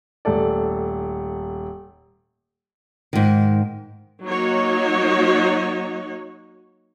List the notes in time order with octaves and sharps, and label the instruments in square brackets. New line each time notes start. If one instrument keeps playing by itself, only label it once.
[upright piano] D#1 A3 A4 D5
[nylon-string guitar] G#2 D#3
[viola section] F#3 A#3 D#4 F#4 C#5